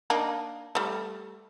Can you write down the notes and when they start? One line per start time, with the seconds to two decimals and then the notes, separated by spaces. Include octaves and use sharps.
0.10 A#3 D4 D#4
0.75 G3 A3